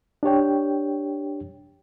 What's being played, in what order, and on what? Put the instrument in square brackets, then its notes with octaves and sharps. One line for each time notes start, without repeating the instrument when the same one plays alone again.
[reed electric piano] D4 G4 C#5 G5